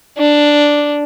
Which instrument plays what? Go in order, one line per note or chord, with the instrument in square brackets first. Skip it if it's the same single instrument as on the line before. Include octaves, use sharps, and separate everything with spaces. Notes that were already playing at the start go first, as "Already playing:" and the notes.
[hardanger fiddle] D4